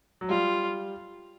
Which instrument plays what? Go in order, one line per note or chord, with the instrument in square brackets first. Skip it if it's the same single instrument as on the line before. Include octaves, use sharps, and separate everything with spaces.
[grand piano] F#3
[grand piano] G3 [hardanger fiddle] F4